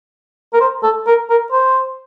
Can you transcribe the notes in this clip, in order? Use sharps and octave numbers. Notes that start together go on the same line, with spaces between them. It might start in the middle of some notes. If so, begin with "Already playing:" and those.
A#4
C5
A4
A#4
A#4
C5